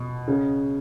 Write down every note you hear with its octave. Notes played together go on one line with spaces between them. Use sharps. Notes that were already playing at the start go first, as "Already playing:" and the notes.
Already playing: B2
C#3